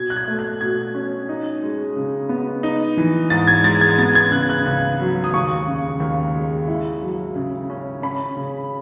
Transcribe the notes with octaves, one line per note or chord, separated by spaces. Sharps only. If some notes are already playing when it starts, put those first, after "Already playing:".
Already playing: B2 G#6
F#6
G#6
A3
F#6
B2 G#6
C#4
D#4
G#3
C#3
B3
D#4
E3
G#2 A6
G#6
G#3 A6
G#6
B3 A6
G#6
C#3 F#6
F#6
C#2
F#3
D#6
D#2 C#6
C#3
D#2
G#3
E4
F#3
C#3
C#4
C#4 B5
C#3